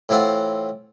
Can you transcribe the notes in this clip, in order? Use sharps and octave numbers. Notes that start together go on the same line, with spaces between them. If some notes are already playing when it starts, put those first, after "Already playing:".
A2 E3 C4 F4 F#5